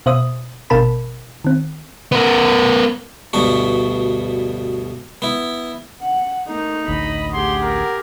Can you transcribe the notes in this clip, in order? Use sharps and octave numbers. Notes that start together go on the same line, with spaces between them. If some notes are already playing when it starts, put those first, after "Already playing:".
B2 C5 E5 D#6
G#1 B2 A#4 A5 B5
D#3 C4
B3 A#4
D2 G2 B2 B3 F#4
B3 E4
F#5
A3 A#3 D#4
A1 D2 D#5 B5
A3 G4 G#4 F#5 C6
A#4